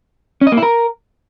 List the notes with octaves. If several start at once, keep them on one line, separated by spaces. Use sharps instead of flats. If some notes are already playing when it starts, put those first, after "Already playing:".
C#4
D#5
A#3
E4
A#4